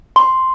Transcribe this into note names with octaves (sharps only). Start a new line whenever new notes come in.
C6